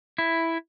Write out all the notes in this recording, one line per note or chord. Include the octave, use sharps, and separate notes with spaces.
E4